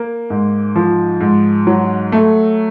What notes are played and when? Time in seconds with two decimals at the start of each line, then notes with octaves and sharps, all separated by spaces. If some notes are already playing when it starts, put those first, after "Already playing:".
Already playing: A#3
0.30 G#2
0.76 F3
1.21 G#2
1.67 F#3
2.12 A3